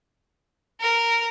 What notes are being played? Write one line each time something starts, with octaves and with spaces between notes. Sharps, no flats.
A#4